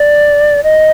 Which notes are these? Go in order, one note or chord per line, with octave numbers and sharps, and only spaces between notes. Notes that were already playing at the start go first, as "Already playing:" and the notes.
Already playing: D5
D#5